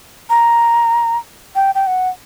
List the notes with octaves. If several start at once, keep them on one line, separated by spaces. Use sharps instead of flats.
A#5
G5
G5
F#5